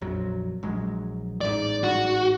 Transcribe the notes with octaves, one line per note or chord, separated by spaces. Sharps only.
A#1 F2 F#3
A#1 F#3 G#3
A1 G#2 D5
F#4